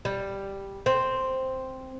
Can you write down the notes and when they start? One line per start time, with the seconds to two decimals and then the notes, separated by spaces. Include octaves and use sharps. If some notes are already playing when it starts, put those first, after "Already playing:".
0.05 G3
0.86 C4